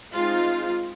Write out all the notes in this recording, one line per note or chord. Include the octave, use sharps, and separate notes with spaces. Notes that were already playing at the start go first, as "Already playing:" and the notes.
G#3 C4 D#4 F4